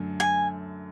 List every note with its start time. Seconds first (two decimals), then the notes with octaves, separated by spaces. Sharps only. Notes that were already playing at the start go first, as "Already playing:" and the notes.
Already playing: F#2 D3 A3
0.20 G#5